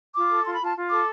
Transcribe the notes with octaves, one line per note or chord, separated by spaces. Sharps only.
F4 D6
A4
F4 C6
B5
F4 A5
F4
A4 D6